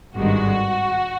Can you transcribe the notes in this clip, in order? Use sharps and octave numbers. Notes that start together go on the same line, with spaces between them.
G#1 G2 D#3 G#3 F#4